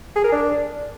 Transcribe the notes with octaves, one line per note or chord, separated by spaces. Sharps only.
G#4
A#4
D4